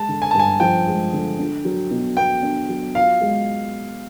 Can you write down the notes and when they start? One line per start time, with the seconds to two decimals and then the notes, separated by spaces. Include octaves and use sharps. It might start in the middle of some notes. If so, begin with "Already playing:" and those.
Already playing: G#3 A5
0.09 D3
0.22 G#5
0.31 G2 A5
0.39 G#5
0.60 F3 G5
0.87 G#3
1.13 D3
1.39 D4
1.65 F#3
1.91 B2
2.17 B3 G5
2.43 D4
2.69 F#3
2.95 F4 F5
3.21 G#3